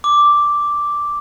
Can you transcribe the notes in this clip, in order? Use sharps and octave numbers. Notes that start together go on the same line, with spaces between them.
D6